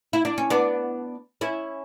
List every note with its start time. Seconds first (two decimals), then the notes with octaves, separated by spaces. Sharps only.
0.13 E4
0.25 D4
0.38 C#4
0.50 B3 D4
1.41 C#4 E4